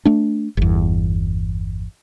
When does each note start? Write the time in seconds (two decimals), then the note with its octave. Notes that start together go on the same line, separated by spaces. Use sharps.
0.05 A3 D4
0.57 G1 E2